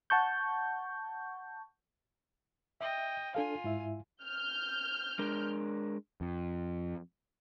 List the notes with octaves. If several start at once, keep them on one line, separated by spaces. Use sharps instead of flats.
F#5 A5 C#6 G6
D#5 E5 G5
D4 F4 A4 F5 G#5
G#2 E4 E5
F6 G6
G#3 D4 A#4
F2